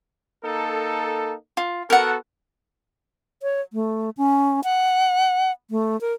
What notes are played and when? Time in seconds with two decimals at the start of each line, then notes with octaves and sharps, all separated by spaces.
0.44 A#3 D#4 A4
1.57 F4
1.90 B3 F#4 A4 A#4 F#5
3.43 C#5
3.73 A3
4.17 C#4
4.64 F#5
5.71 A3
6.01 A#4